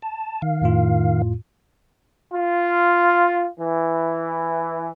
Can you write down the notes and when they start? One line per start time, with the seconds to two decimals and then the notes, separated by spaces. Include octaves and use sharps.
0.02 A5
0.42 D#3 F5
0.62 F2 A2 F4
2.33 F4
3.60 E3